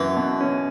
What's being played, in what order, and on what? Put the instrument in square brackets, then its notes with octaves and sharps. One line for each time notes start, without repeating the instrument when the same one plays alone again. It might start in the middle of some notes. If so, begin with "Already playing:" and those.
Already playing: [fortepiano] F#2 [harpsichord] E3
[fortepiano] B2
C#4